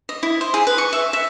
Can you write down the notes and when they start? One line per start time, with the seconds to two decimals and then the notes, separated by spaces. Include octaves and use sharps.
0.09 D#5
0.23 E4
0.41 C5
0.54 G#4
0.67 B4
0.78 C#6
0.93 E5
1.13 E5